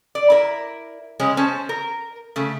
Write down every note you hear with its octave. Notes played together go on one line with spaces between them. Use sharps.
D5
E4 A#4
C#3 G#3 C#4
C#4 C5 A5
A#4
C#3 A3